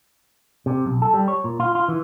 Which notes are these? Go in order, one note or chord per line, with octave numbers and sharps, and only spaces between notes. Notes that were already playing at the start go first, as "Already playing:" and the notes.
C3
B1
A4
G3
C#5
A#2
F4
F4
E3